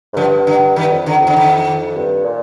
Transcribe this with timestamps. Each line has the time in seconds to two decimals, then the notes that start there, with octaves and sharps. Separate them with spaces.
0.13 G#2
0.17 G2 D3 F3
0.47 D3
0.76 G2 D#3
0.92 F2
1.06 D3
1.21 F2
1.27 D3
1.36 D#3
1.97 G2
2.26 A#2